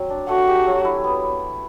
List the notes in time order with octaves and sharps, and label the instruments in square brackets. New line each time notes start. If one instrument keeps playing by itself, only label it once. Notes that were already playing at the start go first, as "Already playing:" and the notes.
Already playing: [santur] F#3 C4
D4
[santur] A3 [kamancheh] F#4
[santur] G4
F#3
E4
B3